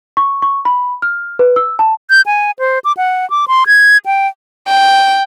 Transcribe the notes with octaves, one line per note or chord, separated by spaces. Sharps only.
C#6
C#6
B5
F6
B4
E6
A5
G6
G#5
C5
D6
F#5
D6
C6
G#6
G5
G5